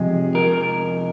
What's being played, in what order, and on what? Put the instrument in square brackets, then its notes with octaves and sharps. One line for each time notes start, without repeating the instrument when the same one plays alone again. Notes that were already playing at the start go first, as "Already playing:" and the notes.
Already playing: [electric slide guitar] F2 C3 G#3 G#4
A#4